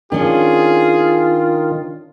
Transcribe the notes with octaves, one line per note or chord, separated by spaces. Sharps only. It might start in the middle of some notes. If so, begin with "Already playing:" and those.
D#3 C#4 D4 F4 G#4